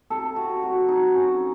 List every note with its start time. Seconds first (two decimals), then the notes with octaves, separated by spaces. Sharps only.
0.10 C3 A4
0.36 C3 F#4
0.62 F#3 F#4
0.89 C3 D#4
1.15 F#3 C#4